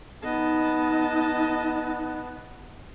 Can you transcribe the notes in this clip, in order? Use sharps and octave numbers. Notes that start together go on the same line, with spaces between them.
B3 D#4 D#5 A5